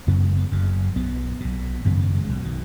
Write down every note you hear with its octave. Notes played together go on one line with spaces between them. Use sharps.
F#1 F#2 C#3 B3
G#3
B3
F#1 F#2 C#3
B1 B2 B3
B1 B2
G#1 F#2 C#3 B3
B3
G#3
B1 B2
D#3